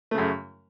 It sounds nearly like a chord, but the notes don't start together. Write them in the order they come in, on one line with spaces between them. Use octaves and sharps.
A3 C#3 F#2